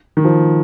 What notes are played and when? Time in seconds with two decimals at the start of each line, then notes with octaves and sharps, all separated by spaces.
0.17 D#3
0.25 F3